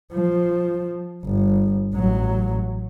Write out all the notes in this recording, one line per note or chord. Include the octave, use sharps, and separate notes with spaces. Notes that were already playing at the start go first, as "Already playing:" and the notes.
F3
G1
A1 F#3